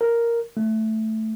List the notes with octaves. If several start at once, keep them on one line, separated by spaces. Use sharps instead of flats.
A#4
A3